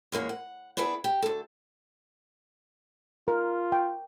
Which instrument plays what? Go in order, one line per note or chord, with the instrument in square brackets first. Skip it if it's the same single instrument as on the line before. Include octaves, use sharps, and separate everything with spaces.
[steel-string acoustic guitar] E2 G#3 A#3 C#4
F#5
B3 D4 E4 G#4 B4
G4
D2 A4
[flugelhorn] F4 [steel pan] A#4
[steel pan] G5